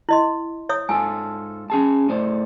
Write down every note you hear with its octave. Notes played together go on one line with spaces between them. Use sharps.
E4 D#5 C6
C#5 E5 D#6
G#2 F4 A4 G#5
C#4 G#4 A5
A2 C5 D5